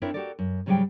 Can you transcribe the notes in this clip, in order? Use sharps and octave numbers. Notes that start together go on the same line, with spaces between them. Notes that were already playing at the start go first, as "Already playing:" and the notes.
C4 D4 E4 A#4 C#5
F#4 G4 A4 A#4 D5
F#2
G#2 C#3 F#3 G3 G#4 G5